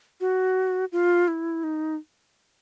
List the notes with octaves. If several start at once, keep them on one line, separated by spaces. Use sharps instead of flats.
F#4
F4
E4
D#4